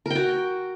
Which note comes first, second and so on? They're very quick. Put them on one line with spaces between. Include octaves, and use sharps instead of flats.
A#4 G5 F#4